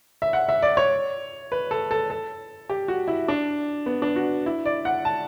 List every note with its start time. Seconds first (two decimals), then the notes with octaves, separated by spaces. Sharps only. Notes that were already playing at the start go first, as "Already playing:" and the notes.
0.22 E5
0.33 F#5
0.49 E5
0.62 D5
0.77 C#5
1.52 B4
1.71 A4
1.91 A4
2.10 A4
2.70 G4
2.88 F#4
3.08 E4
3.28 D4
3.86 B3
4.02 D4
4.16 F#4
4.46 E4
4.66 D5
4.85 F#5
5.05 A5